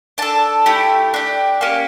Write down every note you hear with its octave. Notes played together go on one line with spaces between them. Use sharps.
D4 A4 A5
A3 E4 G4
D4 G4
A#3 C#4 G4